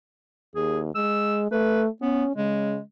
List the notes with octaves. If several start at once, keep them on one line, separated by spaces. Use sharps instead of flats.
D#2 G#4
G#3 E6
A3 B4
B3 C#4
C#3 G#3